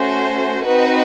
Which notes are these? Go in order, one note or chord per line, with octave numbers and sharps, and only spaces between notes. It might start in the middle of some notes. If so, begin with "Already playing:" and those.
Already playing: A3 C#4 F#4 C5
C4 D#4 F#4 B4